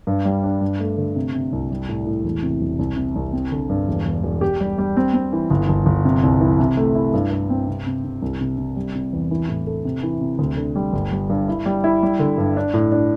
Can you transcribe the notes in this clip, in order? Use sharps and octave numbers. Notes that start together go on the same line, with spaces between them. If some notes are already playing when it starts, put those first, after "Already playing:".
G2
G3
D4
G2
A3
D3
C3
C3
C2
G3
A2
A2
E1
C3
E1
C2
C3
C2
C4
D3
G2
E1
E1
E1
G4
G3
G3
C4
C4
E3
G1
G1
G1
C3
C2
E3
C3
A3
E4
G2
G2
C4
C3
C3
C3
C2
C3
C3
G3
C3
E2
E3
A2
A4
C3
E3
C3
D2
D3
G3
G1
G3
G2
E4
G3
E4
G3
D3
G2
D4
A2
D4